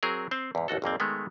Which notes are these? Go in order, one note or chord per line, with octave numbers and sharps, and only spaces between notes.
F#3 C4 G#4 A#4
C4 C5
E2 G#2
A1 D#2 F#4 A4
G#1 F2 A#3 C4
D#3 G#3 A3 B3